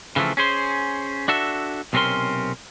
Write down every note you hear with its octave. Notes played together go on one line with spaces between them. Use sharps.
C#3 E3 F3 A3 C4
C#4 G#4 C5
D4 F#4 A4 E5
B1 C3 C4 C#4 A#4 C6